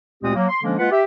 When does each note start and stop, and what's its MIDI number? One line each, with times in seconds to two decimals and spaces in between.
0.22 0.31 38
0.22 0.31 46
0.22 0.31 56
0.22 0.31 60
0.22 0.31 67
0.22 0.31 87
0.35 0.48 54
0.35 0.48 58
0.48 0.61 84
0.62 0.75 50
0.62 0.75 53
0.62 0.75 56
0.62 0.75 58
0.62 0.75 61
0.62 0.75 62
0.77 0.89 56
0.77 0.89 58
0.77 0.89 65
0.77 0.89 71
0.77 0.89 78
0.90 1.02 67
0.90 1.02 76